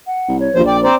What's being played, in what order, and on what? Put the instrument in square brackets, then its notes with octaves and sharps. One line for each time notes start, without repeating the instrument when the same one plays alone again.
[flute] F#5
[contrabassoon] C2
[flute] C#5
[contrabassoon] A#1 [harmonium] D#2 F3 C5
[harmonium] D5 [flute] G5
[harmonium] C4 C5 D5 [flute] A#5